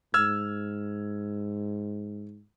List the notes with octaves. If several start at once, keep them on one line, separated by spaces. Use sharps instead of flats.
G#2 E6 F6 G#6